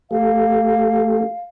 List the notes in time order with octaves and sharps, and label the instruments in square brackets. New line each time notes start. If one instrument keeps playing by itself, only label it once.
[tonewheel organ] A3 G4 A4 [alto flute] F5